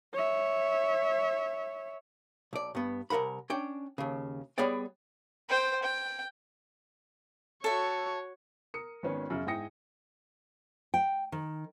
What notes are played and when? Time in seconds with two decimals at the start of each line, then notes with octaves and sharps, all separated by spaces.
0.13 C#5 E5
2.53 B1 D5
2.75 G2 B3
3.10 C2 C#3 A#4 F#5 B5
3.50 C#4 D4 G5
3.98 D#2 C#3
4.58 G3 B3 G#4 C#5 D5 G5
5.49 C5 G5
5.82 G5
7.64 F#4 A4 C#5 E5
8.74 A#4 D#6 C#7
9.03 G#1 D#3 B3 C#4 B4
9.30 F#2 C#3
9.47 G#2 E4 G5 D#6 A#6 C#7
10.94 G5
11.32 D#3